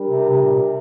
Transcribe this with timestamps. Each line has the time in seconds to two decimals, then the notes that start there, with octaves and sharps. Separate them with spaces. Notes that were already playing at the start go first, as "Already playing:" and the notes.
Already playing: G3 D4 G4 A#4
0.10 C3
0.29 C3
0.43 A#2
0.55 C3